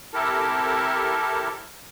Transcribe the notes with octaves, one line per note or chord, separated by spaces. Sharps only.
C3 E4 G4 A4 A#4 A5